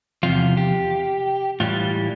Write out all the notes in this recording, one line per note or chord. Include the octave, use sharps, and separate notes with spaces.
E2 C3 F3 F4
G4
A2 E3 G3 F4